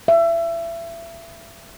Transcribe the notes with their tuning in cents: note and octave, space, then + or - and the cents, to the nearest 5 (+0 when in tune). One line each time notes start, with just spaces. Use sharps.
E5 +25